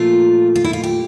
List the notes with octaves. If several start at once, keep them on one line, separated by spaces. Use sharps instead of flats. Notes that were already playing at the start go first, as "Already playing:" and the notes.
Already playing: A#2 F3 A3 F4
F4
E4
F4
G4